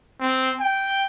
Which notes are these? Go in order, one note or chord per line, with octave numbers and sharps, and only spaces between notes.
C4
G5